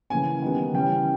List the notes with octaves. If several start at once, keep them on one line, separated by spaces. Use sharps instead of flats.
C#3 E3 A#3 C#4 G#5
D#3 G3 B3
C#3 E3 G3 C#4 G5